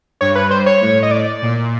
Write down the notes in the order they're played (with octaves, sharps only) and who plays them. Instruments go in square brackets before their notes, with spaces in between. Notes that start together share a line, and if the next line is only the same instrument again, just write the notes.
[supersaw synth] G2 [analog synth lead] C#5
[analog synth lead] B4
C5
C#5
[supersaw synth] A2
[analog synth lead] D#5
D5
[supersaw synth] A#2